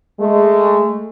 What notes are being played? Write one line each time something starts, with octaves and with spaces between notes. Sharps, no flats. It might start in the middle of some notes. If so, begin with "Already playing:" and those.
G#3 A3